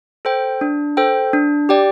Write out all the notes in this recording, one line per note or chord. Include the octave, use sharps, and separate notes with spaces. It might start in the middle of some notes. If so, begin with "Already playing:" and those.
A4 C5 G5
D4
A4 C5 G5
D4
G4 D5 G5